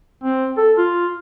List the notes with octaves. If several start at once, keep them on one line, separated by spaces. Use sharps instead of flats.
C4
A4
F4